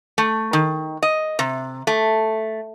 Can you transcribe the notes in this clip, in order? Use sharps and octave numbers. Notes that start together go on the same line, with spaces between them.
A3
D#3
D#5
C3
A3